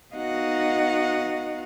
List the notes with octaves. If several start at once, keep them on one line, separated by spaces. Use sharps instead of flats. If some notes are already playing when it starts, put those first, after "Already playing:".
B3 D#4 F#4 D#5 F5 F#5